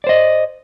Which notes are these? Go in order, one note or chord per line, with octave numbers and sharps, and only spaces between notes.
C5 D5 D#5